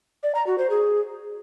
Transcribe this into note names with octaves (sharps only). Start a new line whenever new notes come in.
D5
A#5
F#4
C5
G#4